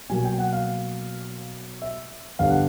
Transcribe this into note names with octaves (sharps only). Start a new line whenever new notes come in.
B2 F#3 A#3 G#5
G5
F#5
F5
E5
G2 D3 G3 B3 D4 F5
F#5